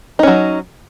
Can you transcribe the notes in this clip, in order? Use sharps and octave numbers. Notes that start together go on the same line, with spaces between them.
F#3 C#4 D#4